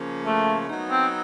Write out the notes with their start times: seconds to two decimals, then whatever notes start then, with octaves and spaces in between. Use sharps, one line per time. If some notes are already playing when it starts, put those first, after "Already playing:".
Already playing: C#3 F3 A#3 C#4
0.25 A3
0.68 F#3 B3 D#4
0.90 C4